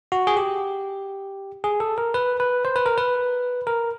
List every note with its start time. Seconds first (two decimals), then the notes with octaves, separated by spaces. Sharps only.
0.12 F#4
0.27 G#4
0.37 G4
1.64 G#4
1.80 A4
1.98 A#4
2.14 B4
2.40 B4
2.65 C5
2.76 B4
2.86 A#4
2.98 B4
3.67 A#4